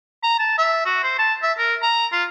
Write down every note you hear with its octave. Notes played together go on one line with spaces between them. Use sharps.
A#5
A5
E5
F#4
C5
A5
E5
A#4
A#5
F4